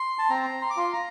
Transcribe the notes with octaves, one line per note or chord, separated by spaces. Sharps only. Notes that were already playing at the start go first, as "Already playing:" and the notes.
Already playing: C6
A5
C4 A#5
C6
D6
F4 C6
A#5